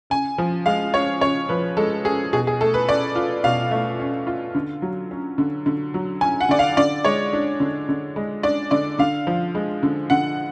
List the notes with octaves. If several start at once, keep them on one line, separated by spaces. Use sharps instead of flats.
C#3 G#5
F3
G#3 F5
C#4 C#5
C#3 C#5
F3 B4
G#3 A4
C#4 G#4
B2 G#4
G#4
A3 A4
B4
C#4 D5
F4
B2 F5
A3
C#4
F4
D3
F#3
C#4
D3
D3
F#3
C#4 G#5
F#5
D3 D5
F5
D3 D5
G#3 C#5
D4
D3
D3
G#3
D4 D5
D3 D5
D3 F5
F3
G#3
D3
D3 F#5